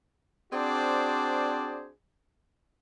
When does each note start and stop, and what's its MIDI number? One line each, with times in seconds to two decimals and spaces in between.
0.52 1.90 60
0.52 1.90 62
0.52 1.90 66
0.52 1.90 68
0.52 1.90 72
0.52 1.90 74